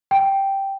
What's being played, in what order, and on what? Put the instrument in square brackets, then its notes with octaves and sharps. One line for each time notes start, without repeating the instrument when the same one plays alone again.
[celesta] G5